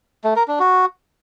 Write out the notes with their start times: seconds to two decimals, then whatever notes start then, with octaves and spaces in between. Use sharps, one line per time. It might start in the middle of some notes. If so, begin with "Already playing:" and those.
0.24 A3
0.36 A#4
0.48 D4
0.60 F#4